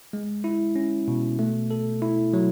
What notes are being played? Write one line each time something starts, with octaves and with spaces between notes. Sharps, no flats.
G#3
E4
C#4
B2
A3
A4
E4
F#3